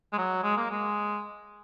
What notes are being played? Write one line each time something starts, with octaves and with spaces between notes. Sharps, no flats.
G#3
F#3
G#3
A#3
G#3